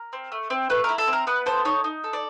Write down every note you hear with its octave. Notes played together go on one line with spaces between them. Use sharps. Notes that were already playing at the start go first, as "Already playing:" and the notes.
Already playing: A#4
C4
A3
C4
A3 B4
E4 A#4
A4
C4
A#4
B3 B4
A4 C5
D#4 C#5
D#4
A4
D5